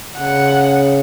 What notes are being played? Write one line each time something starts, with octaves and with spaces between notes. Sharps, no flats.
C#3 F#5